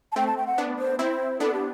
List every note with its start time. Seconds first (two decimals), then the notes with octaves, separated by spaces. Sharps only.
0.12 A5
0.16 A3 C4 G5
0.27 A5
0.37 G5
0.47 F#5
0.58 B3 D4
0.79 C5
0.99 C4 E4 C5
1.40 B3 D4 A4
1.53 G4